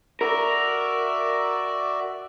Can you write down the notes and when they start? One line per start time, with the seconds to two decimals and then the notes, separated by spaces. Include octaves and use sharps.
0.21 F#4 A#4 D5 E5